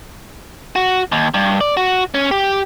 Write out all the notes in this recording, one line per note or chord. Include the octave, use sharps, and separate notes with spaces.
F#4
D#2
G2
D5
F#4
C#4
G4